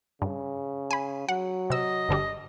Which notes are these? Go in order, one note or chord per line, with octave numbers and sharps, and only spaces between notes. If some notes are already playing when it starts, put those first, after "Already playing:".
G2 C#3
G#5 B5
F#3 F#5
C3 D#5 E6
G1 D3 G3